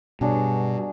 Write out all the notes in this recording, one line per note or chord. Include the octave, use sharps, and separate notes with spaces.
G2 B2 F#3 D4 G#4